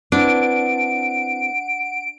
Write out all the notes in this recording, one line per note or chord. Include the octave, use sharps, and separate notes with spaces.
C4 D4 E4 B4 F#5 D7